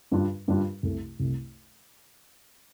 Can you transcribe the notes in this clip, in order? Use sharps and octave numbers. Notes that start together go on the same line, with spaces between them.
G2 G3 D4 F4
G2 G3 D4 F4
C2 C3 A3
C2 C3 A3